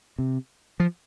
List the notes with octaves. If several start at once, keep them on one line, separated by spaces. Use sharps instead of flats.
C3
F3